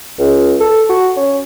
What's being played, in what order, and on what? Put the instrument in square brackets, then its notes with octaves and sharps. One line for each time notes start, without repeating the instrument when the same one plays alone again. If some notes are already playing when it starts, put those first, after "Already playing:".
[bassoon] C#2
A4
F#4
C#4